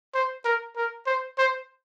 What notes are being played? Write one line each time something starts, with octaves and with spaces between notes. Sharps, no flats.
C5
A#4
A#4
C5
C5